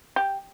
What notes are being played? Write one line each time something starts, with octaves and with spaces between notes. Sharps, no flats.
G4